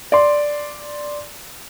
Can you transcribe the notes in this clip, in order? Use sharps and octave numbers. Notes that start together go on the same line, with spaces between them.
D5 C6